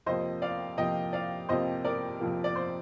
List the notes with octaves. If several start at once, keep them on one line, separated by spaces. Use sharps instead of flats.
F2 C3 F3 A#3 C5 D#5
D5 F5
F2 C3 F3 A#3 D#5 G5
D5 F5
F2 C3 F3 A#3 C5 D#5
A#4 D5
F2 C3 F3 A#3
D5
C5